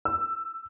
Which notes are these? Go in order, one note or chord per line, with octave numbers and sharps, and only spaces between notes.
E6